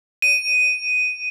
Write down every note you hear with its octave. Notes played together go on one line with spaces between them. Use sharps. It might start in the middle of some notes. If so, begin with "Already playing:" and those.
D#7